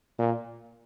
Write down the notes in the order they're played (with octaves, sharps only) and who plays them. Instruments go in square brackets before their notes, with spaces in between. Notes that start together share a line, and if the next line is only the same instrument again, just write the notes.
[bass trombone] A#2